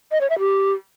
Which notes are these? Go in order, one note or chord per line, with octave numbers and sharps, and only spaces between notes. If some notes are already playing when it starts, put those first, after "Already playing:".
D#5
C#5
E5
G4